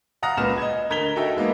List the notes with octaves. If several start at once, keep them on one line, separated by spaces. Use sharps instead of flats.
F5 F#5 A#5 D#6 F6 A#6
C#2 A#2 B4 F6 E7
D#5 G#6
D2 A#4 G#6 B6 F7 G7
D#4 F#4 A4 D#5 E5 G5
G#3 A#3 B3 D#4